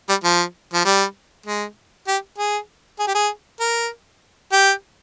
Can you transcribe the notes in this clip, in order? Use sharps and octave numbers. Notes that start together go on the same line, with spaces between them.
G3
F3
F3
G3
G#3
G4
G#4
G#4
G4
G#4
A#4
G4